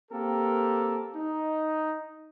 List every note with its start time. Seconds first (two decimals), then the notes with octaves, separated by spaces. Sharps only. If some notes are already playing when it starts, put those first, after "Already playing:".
0.12 A#3 C4 G4 A4 A#4
1.15 D#4